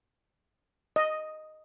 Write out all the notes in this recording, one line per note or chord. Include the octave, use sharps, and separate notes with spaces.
D#5